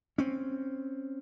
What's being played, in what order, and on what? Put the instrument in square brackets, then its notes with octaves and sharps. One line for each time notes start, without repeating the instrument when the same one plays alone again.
[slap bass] C4 C#4